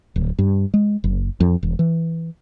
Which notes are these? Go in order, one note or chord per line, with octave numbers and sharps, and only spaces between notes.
D1
G2
G#3
F#1
F2
E1
E3